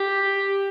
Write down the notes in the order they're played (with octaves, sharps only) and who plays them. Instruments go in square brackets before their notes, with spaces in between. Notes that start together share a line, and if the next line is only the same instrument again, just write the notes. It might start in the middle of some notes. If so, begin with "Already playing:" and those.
Already playing: [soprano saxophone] G4